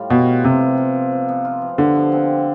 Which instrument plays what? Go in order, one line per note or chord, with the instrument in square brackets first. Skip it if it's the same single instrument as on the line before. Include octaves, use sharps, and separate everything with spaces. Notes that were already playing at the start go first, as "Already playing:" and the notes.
Already playing: [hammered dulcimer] A2 G3 F4
[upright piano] B2 [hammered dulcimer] B3
[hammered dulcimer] F4
[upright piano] C3 [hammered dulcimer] F3
[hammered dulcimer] B3
F4
F3
F3
B3
F4
F3
[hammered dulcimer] G2 [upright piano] D3
[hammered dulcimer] F3
C4